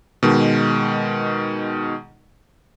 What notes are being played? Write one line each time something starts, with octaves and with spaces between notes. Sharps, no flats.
B2 D#3 G#3